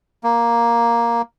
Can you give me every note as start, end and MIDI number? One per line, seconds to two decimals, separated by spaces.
0.24 1.22 58